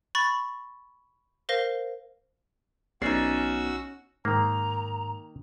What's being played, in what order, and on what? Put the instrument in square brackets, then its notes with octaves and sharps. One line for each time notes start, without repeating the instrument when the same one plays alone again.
[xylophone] B5 C#6 A6
A#4 C5 F5 A#6 G7
[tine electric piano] B1 B3 C7 [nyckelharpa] C#4 [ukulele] D#4 D5 [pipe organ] F#4 E6
[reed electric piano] G#2 [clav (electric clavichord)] D#3 A#3 [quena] A#5